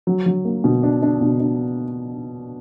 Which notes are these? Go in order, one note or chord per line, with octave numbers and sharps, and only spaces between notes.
F#3
F#3
A#3
B2
D4
D4
B2
D4